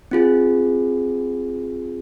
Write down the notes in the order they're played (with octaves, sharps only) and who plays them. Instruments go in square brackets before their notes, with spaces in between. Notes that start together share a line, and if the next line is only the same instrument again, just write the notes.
[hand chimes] C4 F4 G#4